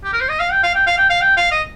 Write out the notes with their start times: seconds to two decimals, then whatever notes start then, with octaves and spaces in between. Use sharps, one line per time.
0.04 G4
0.13 A#4
0.21 C5
0.29 D#5
0.40 F5
0.51 G5
0.63 F5
0.75 G5
0.87 F5
0.98 G5
1.10 F5
1.21 G5
1.37 F5
1.51 D#5